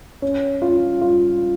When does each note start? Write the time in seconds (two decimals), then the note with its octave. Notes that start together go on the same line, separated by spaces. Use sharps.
0.22 C#4
0.62 F4
1.02 F4